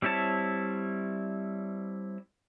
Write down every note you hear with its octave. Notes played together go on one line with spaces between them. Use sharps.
G3 C4 E4 C#5 A5